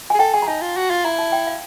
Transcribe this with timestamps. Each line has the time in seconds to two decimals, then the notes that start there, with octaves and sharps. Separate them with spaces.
0.10 G#4 G#5
0.19 A4 G5
0.34 G#4 G#5
0.42 A#5
0.48 D#4 A5
0.61 F4
0.77 F#4
0.90 F4
1.05 E4 A#5
1.19 A5
1.32 G5
1.47 F5